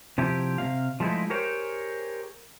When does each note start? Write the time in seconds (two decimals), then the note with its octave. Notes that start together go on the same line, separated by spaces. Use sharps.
0.18 C3 F3 E4 G4
0.58 C3 G#3 F5
1.00 F3 G#3 A3 C#4 D#4 E4
1.30 G4 G#4 A#4 C5 C#5